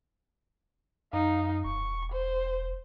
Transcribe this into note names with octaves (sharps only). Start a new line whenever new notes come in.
F#2 D#4 F5
E1 C#6
C5